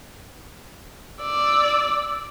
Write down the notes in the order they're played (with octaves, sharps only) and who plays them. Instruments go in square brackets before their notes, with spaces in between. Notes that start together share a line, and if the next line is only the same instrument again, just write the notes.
[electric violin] D5 E6